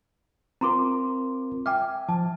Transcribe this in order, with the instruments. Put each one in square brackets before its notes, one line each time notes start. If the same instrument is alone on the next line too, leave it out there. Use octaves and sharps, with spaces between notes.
[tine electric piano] C4 F4 A#4 [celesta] A#5 C6 D6
[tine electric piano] E5 G#5 [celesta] G5 D6 F6
[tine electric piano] F3 [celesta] A5